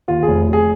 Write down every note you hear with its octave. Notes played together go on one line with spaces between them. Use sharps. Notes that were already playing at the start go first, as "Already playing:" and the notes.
D#2 F4
G#4
F1
F1 G#4